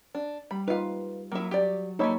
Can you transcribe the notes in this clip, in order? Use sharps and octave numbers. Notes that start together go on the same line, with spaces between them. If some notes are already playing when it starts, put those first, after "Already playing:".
D4
G3 B5
D#4 F4 B4 F5
F#3 A#3 E4 D#6
G4 D5
G3 A#3 D#4 E4 A4 C#5 B5